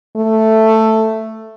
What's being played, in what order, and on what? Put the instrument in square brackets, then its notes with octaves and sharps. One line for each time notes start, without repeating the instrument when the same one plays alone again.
[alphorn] A3